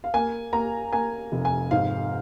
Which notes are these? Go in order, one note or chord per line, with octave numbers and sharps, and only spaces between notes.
F5
A#3 G#5
A#3 A#5
A#3 G#5
F1
G#5
G#2 F5